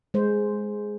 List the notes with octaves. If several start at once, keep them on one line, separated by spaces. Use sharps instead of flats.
G#3 C5